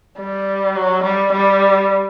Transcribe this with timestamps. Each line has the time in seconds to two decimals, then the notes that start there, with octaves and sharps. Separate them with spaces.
0.18 G3
0.76 F#3
1.04 G3
1.33 G3